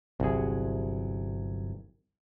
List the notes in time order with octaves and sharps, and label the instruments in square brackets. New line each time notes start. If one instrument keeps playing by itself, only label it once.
[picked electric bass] G1 F#3 [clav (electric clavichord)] C2 G#4